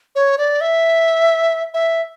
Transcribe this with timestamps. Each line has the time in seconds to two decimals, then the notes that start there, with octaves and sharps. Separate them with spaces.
0.15 C#5
0.38 D5
0.61 E5
1.74 E5